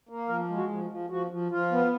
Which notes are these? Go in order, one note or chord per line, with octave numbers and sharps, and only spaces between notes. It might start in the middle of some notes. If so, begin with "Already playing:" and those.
A#3
F3 A#4
G#3
F#4
F3
F3
F3 F#4
F3
F3 F4
B3